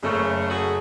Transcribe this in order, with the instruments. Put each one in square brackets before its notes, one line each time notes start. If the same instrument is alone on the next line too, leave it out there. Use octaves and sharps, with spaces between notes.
[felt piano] F#1 C#6 [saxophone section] C#3 A3
[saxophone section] A3 F#4 G#4